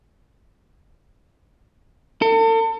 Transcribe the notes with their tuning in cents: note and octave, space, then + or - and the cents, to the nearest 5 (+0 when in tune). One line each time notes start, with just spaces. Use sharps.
A4 +40